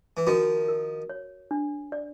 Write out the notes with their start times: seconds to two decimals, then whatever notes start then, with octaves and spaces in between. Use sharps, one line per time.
0.17 E3
0.27 D#3 F3 F#4
0.68 A#4
1.10 C#5
1.51 D4
1.92 D5